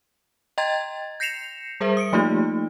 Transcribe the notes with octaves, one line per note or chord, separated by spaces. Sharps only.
D#5 G5 A#5 C6 G#6 A6
G6 A#6 C7 C#7 E7 F7
G3 G#4 A#4 C5 E5
D#6 C#7 D7
F3 A3 A#3 D#4 F4 G4